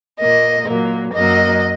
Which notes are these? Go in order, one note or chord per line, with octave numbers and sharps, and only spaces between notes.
A#2 A#3 D#5
A#2 F#3 A#3
F#2 F#3 A#3 D#5